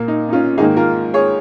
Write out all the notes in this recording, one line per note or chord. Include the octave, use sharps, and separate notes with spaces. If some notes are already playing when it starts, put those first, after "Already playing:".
Already playing: A#2 A#3
D#4
D#4
C#4 F4
G#2 D#3 A#3 D#4 G#4
F4 A#4
G#4 C#5